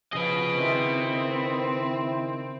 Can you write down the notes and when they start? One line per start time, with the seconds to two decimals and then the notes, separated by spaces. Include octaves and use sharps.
0.13 C#3 F3 G#4 B4 D#5
0.57 D#3 C4 E4